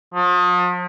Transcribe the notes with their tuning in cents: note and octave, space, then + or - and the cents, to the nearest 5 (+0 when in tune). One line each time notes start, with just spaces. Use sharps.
F3 +40